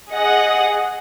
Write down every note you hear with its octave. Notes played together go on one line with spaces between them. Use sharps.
G#4 D#5 F#5